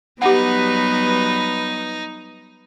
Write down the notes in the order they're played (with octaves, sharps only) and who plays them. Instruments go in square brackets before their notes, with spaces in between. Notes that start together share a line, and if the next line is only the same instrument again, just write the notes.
[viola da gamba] F#3 G3 B3 [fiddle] D#4 [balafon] G4 F#5 [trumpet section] B4